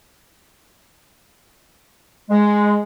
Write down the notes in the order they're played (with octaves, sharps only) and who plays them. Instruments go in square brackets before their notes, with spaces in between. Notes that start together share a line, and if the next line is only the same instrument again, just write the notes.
[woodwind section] G#3